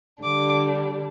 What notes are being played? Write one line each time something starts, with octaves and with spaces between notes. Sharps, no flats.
D3 G3 D4 D6